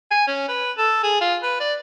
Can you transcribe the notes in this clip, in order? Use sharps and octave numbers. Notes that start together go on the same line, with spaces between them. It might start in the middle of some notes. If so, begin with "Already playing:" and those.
G#5
C#4
B4
A4
G#4
F4
B4
D5